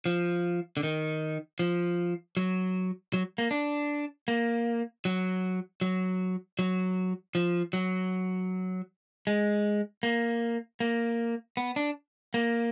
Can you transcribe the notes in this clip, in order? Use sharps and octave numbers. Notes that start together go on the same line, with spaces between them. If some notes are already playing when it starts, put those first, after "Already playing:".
F3
D3
D#3
F3
F#3
F#3
A#3
D4
A#3
F#3
F#3
F#3
F3
F#3
G#3
A#3
A#3
B3
D4
A#3